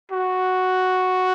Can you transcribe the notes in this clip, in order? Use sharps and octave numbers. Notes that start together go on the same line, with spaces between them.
F#4